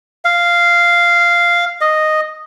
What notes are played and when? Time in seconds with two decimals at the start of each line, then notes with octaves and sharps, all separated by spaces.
0.25 F5
1.81 D#5